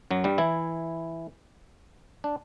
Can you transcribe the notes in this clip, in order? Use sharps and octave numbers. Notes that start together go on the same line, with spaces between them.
F#2 F#3
G2 G3
E3 E4
D4